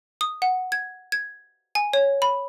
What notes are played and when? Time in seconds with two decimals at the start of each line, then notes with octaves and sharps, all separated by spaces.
0.21 D#6
0.42 F#5
0.72 G#6
1.12 G#6
1.75 G#5
1.93 C#5
2.22 B5